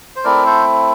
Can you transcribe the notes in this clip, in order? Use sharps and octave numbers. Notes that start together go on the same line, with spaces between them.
C5
A3 C4 E4 A#4 D5
A4 C5